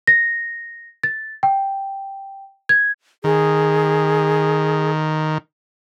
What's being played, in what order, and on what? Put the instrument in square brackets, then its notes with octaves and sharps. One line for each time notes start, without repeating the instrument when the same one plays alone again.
[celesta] A#6
A6
G5
G#6
[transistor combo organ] D#3 [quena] G#4